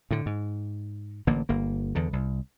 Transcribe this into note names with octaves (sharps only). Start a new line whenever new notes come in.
A2 D3
G#2
A1 D3 A#3
G1 A#3
E2 D3
C2